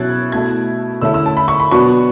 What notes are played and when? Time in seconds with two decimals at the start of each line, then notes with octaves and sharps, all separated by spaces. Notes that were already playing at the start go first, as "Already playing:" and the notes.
Already playing: B2 F#3 C#4 E4 F#6 G#6 A6
0.32 B2 A3 E4 G#6
1.02 D3 A3 C#4 E4 E6
1.14 E6
1.26 A5
1.37 B5
1.48 C#6
1.60 B5
1.71 B2 F#3 B3 D4 C#6